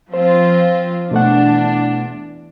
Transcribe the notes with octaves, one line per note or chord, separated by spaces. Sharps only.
F3 C4 F4 C5
E2 B2 A3 D4 F#5